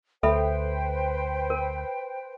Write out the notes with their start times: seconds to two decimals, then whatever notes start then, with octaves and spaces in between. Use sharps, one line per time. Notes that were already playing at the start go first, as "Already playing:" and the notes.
0.23 D2 A4 B4 C5 E5 G5 B5
1.50 A#4